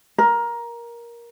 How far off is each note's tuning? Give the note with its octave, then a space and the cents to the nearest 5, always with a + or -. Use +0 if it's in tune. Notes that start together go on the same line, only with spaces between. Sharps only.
A#4 +15